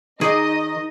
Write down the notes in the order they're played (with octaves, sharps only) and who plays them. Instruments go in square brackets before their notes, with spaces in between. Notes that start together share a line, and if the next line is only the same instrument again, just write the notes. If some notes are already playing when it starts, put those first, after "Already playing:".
[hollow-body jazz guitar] D#3 [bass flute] D#4 [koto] G#4 D5 [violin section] D#5